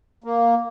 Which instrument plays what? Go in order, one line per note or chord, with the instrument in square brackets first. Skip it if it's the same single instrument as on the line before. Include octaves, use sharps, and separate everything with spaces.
[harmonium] A#3